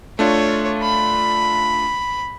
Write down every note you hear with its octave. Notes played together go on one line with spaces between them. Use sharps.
A3 D4 F4 C#5
B5